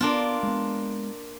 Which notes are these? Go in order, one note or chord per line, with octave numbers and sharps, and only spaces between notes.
A#3 B3 D4 F4
G#3 B3